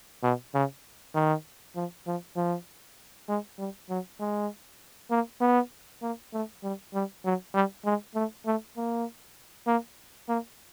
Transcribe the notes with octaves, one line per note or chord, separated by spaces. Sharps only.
B2
C#3
D#3
F3
F3
F3
G#3
G3
F#3
G#3
A#3
B3
A#3
A3
G3
G3
F#3
G3
G#3
A3
A3
A#3
A#3
A#3